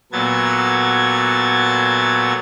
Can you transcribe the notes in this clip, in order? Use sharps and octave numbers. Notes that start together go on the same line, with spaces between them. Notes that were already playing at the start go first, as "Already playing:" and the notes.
A#2 F#3 B3 A4 G#6 A6